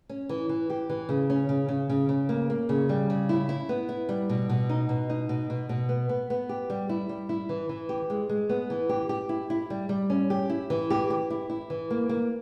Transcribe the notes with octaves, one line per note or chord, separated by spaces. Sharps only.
C#4
E3
E3
G4
E3
C#3
C#4
C#3
C#3
C#3
C#3
A#3
A#3
C#3
G3
C#3
E4
E4
B3
E4
G3
B2
B2
D#4
B2
D#4
B2
B2
B2
B3
B3
B3
G4
G3
E4
G3
E4
E3
E3
G4
G#3
G#3
B3
E3
G4
G4
E4
E4
G3
G3
C#4
G4
E4
E3
G4
G4
E4
E4
E3
A#3
A#3